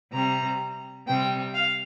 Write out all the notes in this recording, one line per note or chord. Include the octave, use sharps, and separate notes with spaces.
C3 G3 A#5
C3 G3 G5
F5